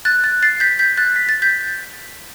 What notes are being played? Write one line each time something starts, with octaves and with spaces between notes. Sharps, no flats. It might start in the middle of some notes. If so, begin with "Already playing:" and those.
F#6 A6
F#6 A6
A6 C7
G6 B6
G6 B6
F#6 A6
B6
A6
G6 B6